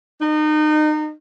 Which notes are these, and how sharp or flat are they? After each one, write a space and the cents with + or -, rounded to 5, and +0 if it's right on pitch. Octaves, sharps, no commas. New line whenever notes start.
D#4 -30